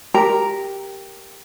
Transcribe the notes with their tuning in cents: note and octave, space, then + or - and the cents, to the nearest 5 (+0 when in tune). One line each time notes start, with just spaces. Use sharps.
G4 +0 A#4 +0 A#5 +0